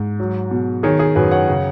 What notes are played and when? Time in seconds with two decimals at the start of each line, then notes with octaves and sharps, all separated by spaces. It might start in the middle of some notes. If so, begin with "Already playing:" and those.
Already playing: G#2
0.20 F#3
0.51 B2
0.83 D#3 G#4 C#5
0.99 G#4
1.15 F#2 F#4 B4
1.31 C#5 F#5
1.48 C#3